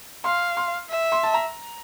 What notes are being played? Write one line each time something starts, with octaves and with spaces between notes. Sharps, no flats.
F5 C6
C6
E5
C6
A5
A#5